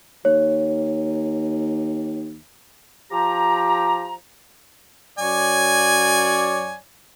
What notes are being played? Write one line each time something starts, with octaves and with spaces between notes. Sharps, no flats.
D#2 C#5
F3 G4 A#5
F#2 C#5 D5 G#5